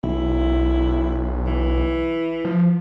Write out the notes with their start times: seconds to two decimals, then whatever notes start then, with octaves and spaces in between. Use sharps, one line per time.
0.04 B1 E4
1.47 E3
2.45 F3